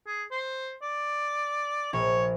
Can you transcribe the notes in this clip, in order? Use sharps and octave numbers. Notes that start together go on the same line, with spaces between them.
G#4
C5
D5
A#1 C#5